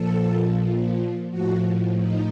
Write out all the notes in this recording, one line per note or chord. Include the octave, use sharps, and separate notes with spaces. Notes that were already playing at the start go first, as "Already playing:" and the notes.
Already playing: A#2 F3 A4
A2 F3 F#4
D#4